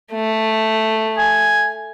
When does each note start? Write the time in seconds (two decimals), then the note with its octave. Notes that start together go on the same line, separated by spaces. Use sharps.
0.13 A3
1.18 G#5